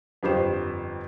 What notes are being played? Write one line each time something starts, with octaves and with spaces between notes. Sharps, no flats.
G1 F2 G4 C5 E7